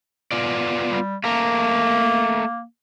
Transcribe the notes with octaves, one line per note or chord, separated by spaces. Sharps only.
B3 F4 D5
G3
A3 A#3 A#4